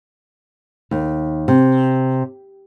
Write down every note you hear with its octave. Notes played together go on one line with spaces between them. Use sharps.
D#2
C3